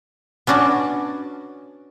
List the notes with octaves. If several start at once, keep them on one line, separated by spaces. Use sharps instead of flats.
B3 C#4 D4 F#4 D5